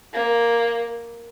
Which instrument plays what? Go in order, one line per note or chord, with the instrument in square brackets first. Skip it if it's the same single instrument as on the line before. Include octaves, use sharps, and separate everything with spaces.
[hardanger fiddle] A#3